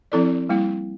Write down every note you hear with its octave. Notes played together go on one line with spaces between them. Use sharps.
F3 C4 E4 A4 D5
G3 A#3 E4